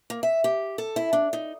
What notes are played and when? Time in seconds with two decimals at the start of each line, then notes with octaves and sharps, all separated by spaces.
0.10 A#3
0.23 E5
0.44 G4
0.78 A4
0.96 E4
1.13 D4
1.33 D#4